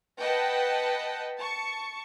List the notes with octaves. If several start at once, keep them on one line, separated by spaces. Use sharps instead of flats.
B4 D#5 F#5 G5 A5
A5 C#6